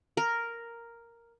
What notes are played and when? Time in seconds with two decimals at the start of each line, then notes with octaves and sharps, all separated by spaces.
0.17 A#4